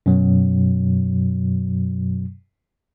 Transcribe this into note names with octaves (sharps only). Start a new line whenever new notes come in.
F#2 B2 F#3